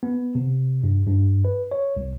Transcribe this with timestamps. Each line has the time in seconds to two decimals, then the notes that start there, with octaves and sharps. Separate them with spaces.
0.03 B3
0.35 C3
0.84 G2
1.07 G2
1.45 B4
1.71 C#5
1.97 C2